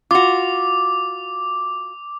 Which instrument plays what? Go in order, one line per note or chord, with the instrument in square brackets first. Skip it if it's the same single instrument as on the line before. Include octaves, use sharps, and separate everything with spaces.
[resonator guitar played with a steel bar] F4 F#4 [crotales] D6